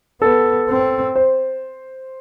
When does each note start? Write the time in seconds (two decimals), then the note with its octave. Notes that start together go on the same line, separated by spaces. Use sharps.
0.22 B3 A4
0.69 C4
1.16 C5